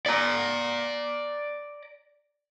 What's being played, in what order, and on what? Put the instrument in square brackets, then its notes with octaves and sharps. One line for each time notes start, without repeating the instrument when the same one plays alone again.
[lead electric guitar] D5 A#5